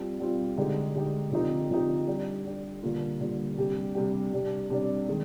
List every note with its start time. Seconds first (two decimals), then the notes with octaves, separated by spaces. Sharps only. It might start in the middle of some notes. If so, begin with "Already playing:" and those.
Already playing: G3 C4 F4
0.20 G3 C4 F4
0.57 D3 G#3 D#4 G4
0.95 D3 G#3 D#4 G4
1.32 D3 F3 C4 D#4 G4
1.70 D3 F3 C4 D#4 G4
2.08 G3 D4 G4
2.45 G3 D4 G4
2.82 D3 G3 A#3 F4
3.20 D3 G3 A#3 F4
3.58 C3 G3 D4 G4
3.95 C3 G3 D4 G4
4.33 C3 G3 D4
4.70 C3 G3 D4
5.09 D#3 G#3